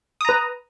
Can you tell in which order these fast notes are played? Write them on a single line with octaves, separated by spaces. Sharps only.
D#6 A#5 B4